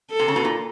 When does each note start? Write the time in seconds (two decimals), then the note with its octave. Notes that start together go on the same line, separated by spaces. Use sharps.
0.11 A4
0.19 C3
0.28 C#3
0.36 B2
0.45 A#2